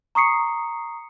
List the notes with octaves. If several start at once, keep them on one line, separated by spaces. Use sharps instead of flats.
A#5 C#6 D#6 C7 C#7